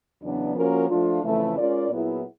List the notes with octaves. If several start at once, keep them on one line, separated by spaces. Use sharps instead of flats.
E2 C#3 F#3 B3 D4
F3 A#3 C#4 F#4 A#4
F3 A3 D4 F4
F2 C#3 E3 A3
G#3 C#4 F4 A#4 D5
A#2 F#3 B3 E4 G#4